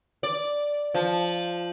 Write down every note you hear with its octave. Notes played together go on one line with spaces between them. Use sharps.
D5
F3